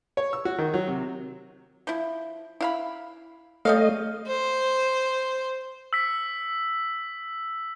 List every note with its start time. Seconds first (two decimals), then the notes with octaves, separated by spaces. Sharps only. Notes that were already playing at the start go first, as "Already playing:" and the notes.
0.17 C#5
0.33 E6
0.45 F#4
0.58 D#3
0.74 F#3
0.88 C3
1.87 F3 E4
2.61 E4 F5 B5
3.65 G3 A3 C#5 D#5 F5
4.27 C5
5.93 E6 B6